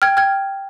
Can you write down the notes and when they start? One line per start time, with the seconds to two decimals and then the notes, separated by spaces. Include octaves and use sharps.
0.02 G5 F6 G#6
0.17 G5 F6 G#6